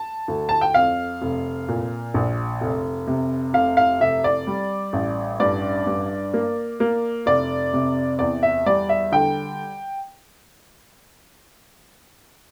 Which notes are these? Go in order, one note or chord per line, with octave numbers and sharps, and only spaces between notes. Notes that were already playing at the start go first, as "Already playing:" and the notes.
Already playing: A5
D2
A5
G5
F2 F5
F1
A#2
A#1
F1
C3
F1 F5
F5
F1 E5
D5
G3
A1
G2 D5
G2
A#3
A#3
F1 D5
C3
E2 D5
E5
G3 D5
E5
D3 G5